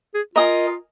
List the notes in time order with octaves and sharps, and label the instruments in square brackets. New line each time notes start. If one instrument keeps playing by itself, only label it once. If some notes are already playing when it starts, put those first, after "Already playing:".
[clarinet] G#4
[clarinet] F4 [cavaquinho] A#4 D#5 G#5 D#6